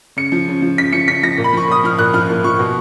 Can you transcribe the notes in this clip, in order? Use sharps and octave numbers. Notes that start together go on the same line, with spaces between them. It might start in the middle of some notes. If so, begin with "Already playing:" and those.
C#3 C#7
F3
C#3
F3
C#3 B6
F3 C#7
C#3 B6
F3 A#6
A#2
B5
F3 C#6
A#2 D#6
F3 F6
A#2 F#6
F3 F6
A#2
F3 C#6
B2